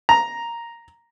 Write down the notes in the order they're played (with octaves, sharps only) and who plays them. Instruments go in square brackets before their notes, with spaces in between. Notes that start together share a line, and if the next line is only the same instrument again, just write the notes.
[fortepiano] A#5